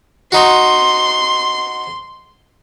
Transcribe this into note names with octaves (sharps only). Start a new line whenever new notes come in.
D#4 F#4 C6